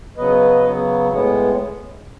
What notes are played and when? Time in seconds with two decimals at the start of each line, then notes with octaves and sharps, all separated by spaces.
0.17 C#3 F#3 B3 B4 D#5
0.63 C#3 F#3 B3
1.09 A2 G#3 B3